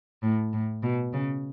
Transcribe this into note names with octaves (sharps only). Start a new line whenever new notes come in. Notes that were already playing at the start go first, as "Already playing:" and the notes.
A2
A2
B2
C#3